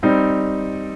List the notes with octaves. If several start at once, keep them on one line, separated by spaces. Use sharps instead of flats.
G3 C4 D#4